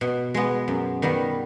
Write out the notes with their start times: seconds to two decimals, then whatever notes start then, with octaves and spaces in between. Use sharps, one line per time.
0.01 B2
0.34 G#3 B3
0.68 F#2
1.02 D#3 G3 B3